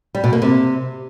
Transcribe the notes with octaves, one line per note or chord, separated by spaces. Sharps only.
G3
B2
A#3
C3